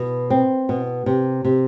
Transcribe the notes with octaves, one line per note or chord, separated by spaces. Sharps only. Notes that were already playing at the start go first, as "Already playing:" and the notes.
Already playing: B2
C4
B2
C3
C3